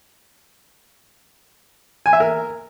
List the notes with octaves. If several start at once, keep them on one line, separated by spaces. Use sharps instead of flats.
G#5
E5
A#4